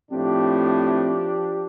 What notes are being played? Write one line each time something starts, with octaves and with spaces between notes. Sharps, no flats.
A2 F3 C4 D4 G4